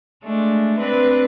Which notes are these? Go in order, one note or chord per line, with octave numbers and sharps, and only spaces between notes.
G#3 A3 D4
C4 D4 B4